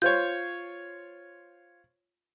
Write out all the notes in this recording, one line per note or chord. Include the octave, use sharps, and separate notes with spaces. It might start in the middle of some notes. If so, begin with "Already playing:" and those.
F4 C5 C#5 G6